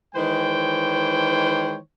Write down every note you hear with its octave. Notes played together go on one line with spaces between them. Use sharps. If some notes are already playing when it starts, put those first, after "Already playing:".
D#3 E3 G#3 C5 C#5 G5